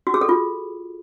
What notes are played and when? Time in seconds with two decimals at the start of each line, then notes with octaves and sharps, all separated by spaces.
0.07 F#4
0.14 G#4
0.21 A4
0.29 F4